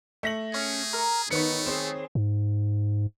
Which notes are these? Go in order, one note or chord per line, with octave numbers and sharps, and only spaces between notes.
A3 A#6 F#7
C#4 G#4
A#4
D#3 A3 B3 D#4 B4 C#5 C#7
C4 G#4 C5
G#2